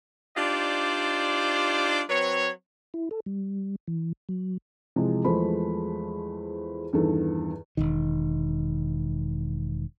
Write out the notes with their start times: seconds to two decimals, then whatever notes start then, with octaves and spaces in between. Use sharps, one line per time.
0.37 D4 D#4 F4 G4 C5 D5
2.09 F#3 C4 B4 C#5
2.94 E4
3.11 A4
3.26 G3
3.88 E3
4.29 F#3
4.96 C3 E3 F3 G#3
5.25 E2 F3 G#3 A3 C5 B5
6.93 E2 G2 D#3 A4
7.77 E1 C2 D#3